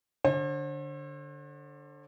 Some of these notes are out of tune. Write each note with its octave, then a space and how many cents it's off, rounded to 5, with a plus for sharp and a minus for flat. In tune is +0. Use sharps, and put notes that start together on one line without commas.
D3 +0 C5 +45